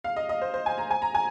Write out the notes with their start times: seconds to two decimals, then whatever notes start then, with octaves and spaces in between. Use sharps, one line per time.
0.04 F5
0.16 D#5
0.29 D#5
0.41 C5
0.54 C5
0.66 G#5
0.78 A#5
0.91 G#5
1.02 A#5
1.15 G#5